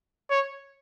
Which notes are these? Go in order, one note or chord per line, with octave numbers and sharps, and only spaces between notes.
C#5